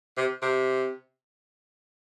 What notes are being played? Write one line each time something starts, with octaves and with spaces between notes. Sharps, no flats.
C3
C3